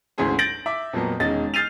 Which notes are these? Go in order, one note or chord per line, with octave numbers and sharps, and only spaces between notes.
G#1 D2 E3 C#4 G#4 C6
G6 A6 A#6 D7 F#7
E5 D6
F2 A#2 F3 F#3 A#3 B3
E1 D#3 G#3 C#4 D#5 A6
F6 G6 A6 C7 D#7 F7